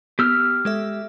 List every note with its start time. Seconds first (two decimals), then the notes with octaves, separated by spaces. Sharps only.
0.19 B3 G4 E6 F6
0.65 G#3 A4 E5